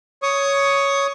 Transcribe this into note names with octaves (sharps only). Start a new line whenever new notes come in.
C#5 C#6 D#6